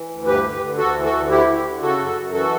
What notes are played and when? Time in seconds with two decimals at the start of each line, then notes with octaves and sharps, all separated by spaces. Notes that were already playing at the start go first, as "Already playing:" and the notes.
Already playing: E3
0.09 D2
0.26 G2 G4 B4
0.43 D3
0.61 D3
0.77 D2 F#4 A4
0.94 E3
1.04 F#4 A4
1.12 D2
1.29 D3 E4 G4
1.47 D3
1.64 D3
1.81 C#3 F#4 A4
1.98 F#2
2.17 F#2
2.33 E3 F#4 A4